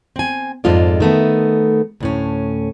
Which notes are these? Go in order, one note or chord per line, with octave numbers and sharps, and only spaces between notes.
C4 G#5
F2 G#2 G#3 F4 A4 D5
D#3 A3 B3
D2 A2 C#4